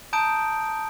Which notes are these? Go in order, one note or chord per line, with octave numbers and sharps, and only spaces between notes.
A5 A#5 D#6 G6 D7